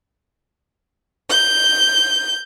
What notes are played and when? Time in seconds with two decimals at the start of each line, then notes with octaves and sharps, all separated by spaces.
1.29 G6